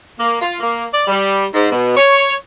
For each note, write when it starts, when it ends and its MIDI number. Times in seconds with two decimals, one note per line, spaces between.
0.20 0.38 58
0.40 0.54 65
0.60 0.84 58
0.92 1.05 74
1.07 1.44 55
1.53 1.69 44
1.70 1.94 47
1.96 2.34 73